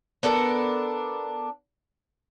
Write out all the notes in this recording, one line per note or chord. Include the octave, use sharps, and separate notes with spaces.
B3 D4 A4 A#4